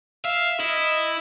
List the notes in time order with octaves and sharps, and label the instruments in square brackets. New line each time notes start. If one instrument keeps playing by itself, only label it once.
[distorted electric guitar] E5 [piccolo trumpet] F5
[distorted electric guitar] E4 [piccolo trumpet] D#5